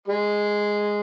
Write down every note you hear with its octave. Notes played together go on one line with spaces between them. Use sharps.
G#3